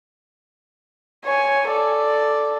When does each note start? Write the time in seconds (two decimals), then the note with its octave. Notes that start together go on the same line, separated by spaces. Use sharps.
1.25 C#5 G#5
1.70 A4 D5